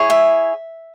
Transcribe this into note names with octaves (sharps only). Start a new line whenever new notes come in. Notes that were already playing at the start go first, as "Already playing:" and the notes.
Already playing: E4 G#4 C#5
E5